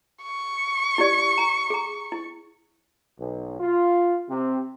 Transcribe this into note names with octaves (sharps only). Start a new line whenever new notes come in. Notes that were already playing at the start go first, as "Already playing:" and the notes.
C#6
E4 G4 D5
A#5
G#4 A#5
E4
B1
F4
C3